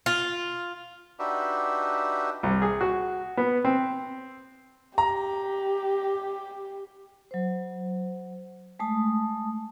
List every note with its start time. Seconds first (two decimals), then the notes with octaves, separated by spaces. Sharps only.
0.06 F4
1.19 D4 D#4 F#4 G4 B4 E5
2.43 C2
2.62 G#4
2.81 F#4
3.37 B3
3.65 C4
4.98 G4 A#5
7.31 F#3 C5
8.79 G#3 A3 A5 D#6